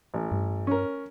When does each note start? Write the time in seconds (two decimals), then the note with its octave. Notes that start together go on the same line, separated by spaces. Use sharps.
0.14 A1
0.32 G2
0.67 C#4 A#4